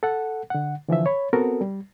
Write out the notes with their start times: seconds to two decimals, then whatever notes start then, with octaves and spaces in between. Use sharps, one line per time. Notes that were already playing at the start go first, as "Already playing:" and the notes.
0.03 A4 F#5
0.50 D3 F#5
0.88 D3 E3 F3 E5
1.06 C#5 B5
1.33 B3 C4 F#4 A4 A#4
1.61 G3